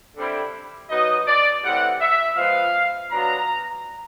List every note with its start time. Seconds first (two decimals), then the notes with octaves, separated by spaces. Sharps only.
0.16 D3 G3 C4 E4
0.90 F#3 B3 D#4 D#5
1.27 D5
1.63 A2 E3 G3 C4 F#5
2.00 E5
2.37 F3 G#3 B3 F5
3.11 F#3 B3 D4 F4 A#5